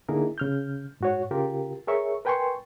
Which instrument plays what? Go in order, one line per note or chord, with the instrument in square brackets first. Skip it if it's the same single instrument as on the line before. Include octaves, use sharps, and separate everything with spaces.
[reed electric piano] D3 A#3 D#4 E4 G#4 A#4
C#3 F6 G6
G#2 F#4 C#5
C#3 F4 G4 A#4
G#4 A#4 C#5 E5 C#6
A#4 B4 G5 G#5 C6 C#6